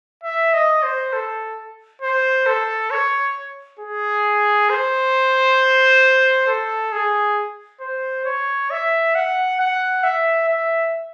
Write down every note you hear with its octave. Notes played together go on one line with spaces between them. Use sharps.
E5
D#5
C5
A4
C5
A4
C#5
G#4
C5
A4
G#4
C5
C#5
E5
F#5
F#5
E5
E5